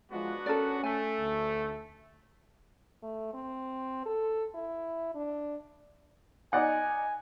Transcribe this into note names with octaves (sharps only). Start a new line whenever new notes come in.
F3 G#3 B3 D4 F#4
C#4 A4 A#4 D5
A3 G#5
D2
A3
C4
A4
E4
D4
D#4 D5 F#5 G#5